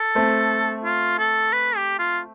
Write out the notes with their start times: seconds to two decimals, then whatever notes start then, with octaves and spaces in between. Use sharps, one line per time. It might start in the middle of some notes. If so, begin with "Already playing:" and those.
Already playing: A4
0.15 A3 C4
0.84 F4
1.19 A4
1.53 B4
1.77 G4
1.99 F4